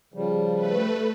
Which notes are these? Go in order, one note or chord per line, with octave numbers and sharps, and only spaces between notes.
C#3 F3 G3
A3 B4